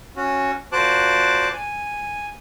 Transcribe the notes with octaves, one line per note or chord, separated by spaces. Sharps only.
C#4 F#4
A#2 F#4 C5 A5 D6 F#6
G#5